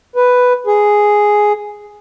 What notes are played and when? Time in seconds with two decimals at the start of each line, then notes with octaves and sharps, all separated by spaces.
0.16 B4
0.67 G#4